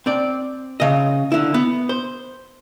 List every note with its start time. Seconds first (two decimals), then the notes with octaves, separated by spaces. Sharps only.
0.06 C4 D5
0.80 C#3 D#5
1.32 D3 E4
1.54 B3
1.89 C5